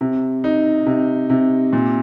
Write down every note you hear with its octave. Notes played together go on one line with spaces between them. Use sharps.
C3
D#4
C3
C3
A#2